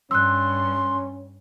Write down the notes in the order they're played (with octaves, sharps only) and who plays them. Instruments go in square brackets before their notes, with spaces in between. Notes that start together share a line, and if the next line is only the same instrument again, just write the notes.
[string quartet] G2 [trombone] C#4 [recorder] C6 [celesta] E6 F#6